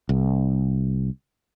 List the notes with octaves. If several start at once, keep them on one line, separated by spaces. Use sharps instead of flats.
C2